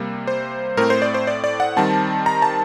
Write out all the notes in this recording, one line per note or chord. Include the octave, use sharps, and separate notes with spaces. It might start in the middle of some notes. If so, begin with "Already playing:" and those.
Already playing: C3 G3 A#3
C5
A2 A3 C4 A#4
C5
D5
C5
D5
D5
F#5
D#3 G3 C4 A5
A#5
A5